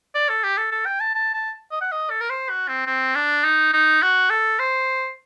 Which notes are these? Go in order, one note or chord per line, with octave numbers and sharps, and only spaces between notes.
D5
A4
G4
A4
A4
G5
A5
A5
A5
D#5
F#5
D#5
A4
A#4
C5
F#4
C4
C4
D4
D#4
D#4
F#4
A4
C5